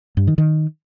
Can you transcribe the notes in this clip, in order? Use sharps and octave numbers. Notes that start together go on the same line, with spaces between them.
G2
D#3
D#3